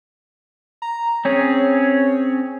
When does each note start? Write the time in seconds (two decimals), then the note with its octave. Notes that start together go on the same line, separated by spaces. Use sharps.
0.82 A#5
1.25 C4 C#4 G#4 C#5